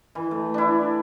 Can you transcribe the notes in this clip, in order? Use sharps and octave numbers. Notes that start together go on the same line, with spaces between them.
E3
A3
D4 E4